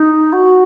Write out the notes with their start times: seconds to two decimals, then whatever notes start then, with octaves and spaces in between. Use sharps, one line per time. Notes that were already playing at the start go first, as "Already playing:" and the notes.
Already playing: D#4
0.32 F#4